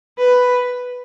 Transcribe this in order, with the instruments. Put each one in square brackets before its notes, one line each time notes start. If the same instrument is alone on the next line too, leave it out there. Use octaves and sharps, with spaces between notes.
[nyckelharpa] B4